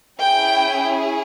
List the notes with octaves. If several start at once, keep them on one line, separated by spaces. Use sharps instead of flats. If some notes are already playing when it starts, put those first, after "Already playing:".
C#4 E4 G#4 G5